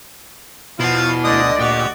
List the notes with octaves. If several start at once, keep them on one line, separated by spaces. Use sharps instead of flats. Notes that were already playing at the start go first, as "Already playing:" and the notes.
B2 F3 E4 F4 F5 F#5
D2 D3 D5 D#5 D#6
A#2 F#4 G4